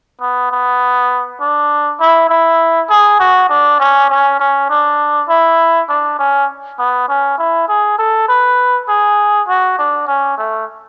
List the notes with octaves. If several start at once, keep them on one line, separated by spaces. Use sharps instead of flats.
B3
B3
D4
E4
E4
G#4
F#4
D4
C#4
C#4
C#4
D4
E4
D4
C#4
B3
C#4
E4
G#4
A4
B4
G#4
F#4
D4
C#4
A3